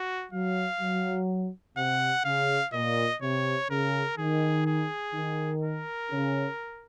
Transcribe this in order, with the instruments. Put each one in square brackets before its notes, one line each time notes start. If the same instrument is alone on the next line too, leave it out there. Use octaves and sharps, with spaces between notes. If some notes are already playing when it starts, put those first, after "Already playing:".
Already playing: [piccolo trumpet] F#4
[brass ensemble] F#3 [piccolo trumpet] F5
[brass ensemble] F#3
[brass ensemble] C3 [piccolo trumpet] F#5
[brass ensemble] C#3 [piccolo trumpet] F5
[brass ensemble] A#2 [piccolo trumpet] D#5
[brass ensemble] C3 [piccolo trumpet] C#5
[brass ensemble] C#3 [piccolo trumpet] A#4
[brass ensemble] D#3 [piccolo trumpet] G#4
[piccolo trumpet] G#4
[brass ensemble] D#3
[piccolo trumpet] A#4
[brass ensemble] C#3